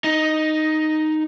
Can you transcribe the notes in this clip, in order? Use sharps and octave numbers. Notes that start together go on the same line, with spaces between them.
D#4